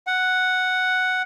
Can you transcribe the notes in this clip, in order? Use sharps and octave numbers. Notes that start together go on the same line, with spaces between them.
F#5